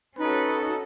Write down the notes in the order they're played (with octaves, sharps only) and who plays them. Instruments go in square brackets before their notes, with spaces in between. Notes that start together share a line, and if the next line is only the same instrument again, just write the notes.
[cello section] C#4 F#4 A4 [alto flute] D#4 [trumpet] B4